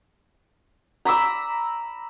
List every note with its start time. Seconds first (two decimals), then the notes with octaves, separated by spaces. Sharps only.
1.05 A#5 B5 D6 E6